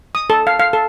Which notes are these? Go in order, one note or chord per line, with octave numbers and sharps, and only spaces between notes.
D#6
A4
F5
F5
A4